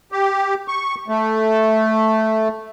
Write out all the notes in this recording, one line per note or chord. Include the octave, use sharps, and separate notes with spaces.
G4
C#6
A3